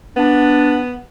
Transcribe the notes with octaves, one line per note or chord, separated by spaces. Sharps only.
B3 D4